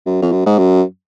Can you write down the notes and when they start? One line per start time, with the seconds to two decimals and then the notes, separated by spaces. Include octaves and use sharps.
0.06 F#2
0.22 F2
0.32 F#2
0.46 G#2
0.58 F#2